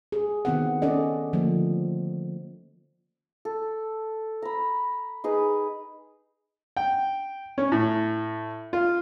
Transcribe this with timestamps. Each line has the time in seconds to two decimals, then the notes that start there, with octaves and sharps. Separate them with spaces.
0.12 G#4
0.45 D#3 B3 C4 E4 A#4 F#5
0.82 C#4 A4 D5 D#5
1.33 D3 F3 A3 A#3
3.45 A4
4.42 A#5 B5
5.24 D#4 G#4 B4
6.77 G5
7.58 C#4
7.72 A2
8.73 F4